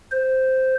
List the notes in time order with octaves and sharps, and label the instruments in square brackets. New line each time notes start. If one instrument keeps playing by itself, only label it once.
[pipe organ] C5